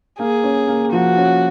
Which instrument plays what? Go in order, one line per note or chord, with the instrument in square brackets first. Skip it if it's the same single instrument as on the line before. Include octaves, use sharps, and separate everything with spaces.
[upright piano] A#3 [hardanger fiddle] G#4
[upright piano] C#4
A#3
[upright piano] F3 [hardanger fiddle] F#4
[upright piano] C#4